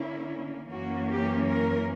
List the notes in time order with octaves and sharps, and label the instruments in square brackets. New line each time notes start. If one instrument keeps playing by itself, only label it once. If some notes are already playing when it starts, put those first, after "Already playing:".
Already playing: [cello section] D3 A#3 C#4 E4
F#2 E3 A#3 C#4 F#4
G4
A#4